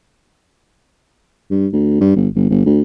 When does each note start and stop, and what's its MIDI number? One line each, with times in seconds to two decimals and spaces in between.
1.50 1.67 43
1.72 1.96 38
2.01 2.16 43
2.16 2.28 31
2.35 2.47 31
2.50 2.65 31
2.66 2.81 38